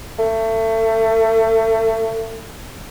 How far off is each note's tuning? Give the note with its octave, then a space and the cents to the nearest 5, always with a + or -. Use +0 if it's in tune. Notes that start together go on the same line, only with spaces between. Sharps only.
A3 +30